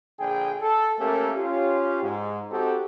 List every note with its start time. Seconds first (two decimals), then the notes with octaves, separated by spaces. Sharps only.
0.20 A#1 D3 G#4 G5
0.61 A4
0.98 A3 A#3 C#4 G4 A4 A#4
1.37 C#4 F4 G4
2.02 G#2
2.51 C4 D#4 F#4 G4 A4